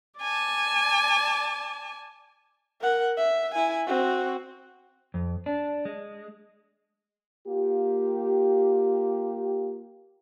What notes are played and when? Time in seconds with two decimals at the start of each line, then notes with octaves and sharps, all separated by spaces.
0.19 D5 G#5 A5
2.81 A#4 F#5
3.17 E5
3.54 E4 G#5
3.87 C4 F#4
5.14 F2
5.46 D4
5.85 G#3
7.48 A#3 F4 G4